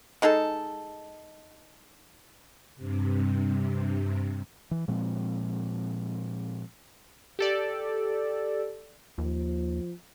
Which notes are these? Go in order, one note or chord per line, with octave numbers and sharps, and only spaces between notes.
G#3 D#4 G#4 A4
G2 C3
E3
A#2 F3 G#3 C4
G4 A4 D5
D#2 F3